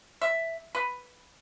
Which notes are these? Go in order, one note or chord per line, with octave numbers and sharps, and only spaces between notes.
E5
B4